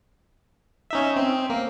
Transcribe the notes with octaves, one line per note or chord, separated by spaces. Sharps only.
C#4 D#4 E5
C4
A#3